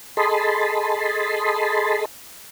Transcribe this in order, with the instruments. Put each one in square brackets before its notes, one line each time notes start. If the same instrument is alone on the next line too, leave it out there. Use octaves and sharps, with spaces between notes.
[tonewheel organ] G#4 A4 D#5 A5 B5 C6